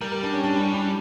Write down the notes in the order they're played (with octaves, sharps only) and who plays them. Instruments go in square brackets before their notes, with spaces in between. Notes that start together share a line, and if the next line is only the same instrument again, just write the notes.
[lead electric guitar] G3 [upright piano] A#4
[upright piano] A#4
D4
C#4
D4
C#4
D4